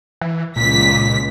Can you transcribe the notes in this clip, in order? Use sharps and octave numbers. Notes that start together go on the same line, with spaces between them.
E3
C#2 A#2 B6
A#2